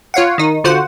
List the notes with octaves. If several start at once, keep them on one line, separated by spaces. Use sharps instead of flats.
F4 C#5 F5 F#5
D#3 D#4
D3 F4 F#4 C5 F#5